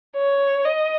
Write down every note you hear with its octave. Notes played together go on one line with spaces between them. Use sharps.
C#5
D#5